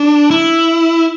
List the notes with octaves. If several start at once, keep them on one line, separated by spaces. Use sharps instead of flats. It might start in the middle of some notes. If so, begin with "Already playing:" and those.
Already playing: D4
E4